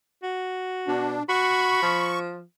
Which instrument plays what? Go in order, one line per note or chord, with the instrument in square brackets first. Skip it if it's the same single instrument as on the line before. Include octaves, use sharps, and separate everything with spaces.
[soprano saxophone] F#4
[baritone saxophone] B2 [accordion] D4
[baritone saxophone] F#4 [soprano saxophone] B5 [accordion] C#6
[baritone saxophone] F3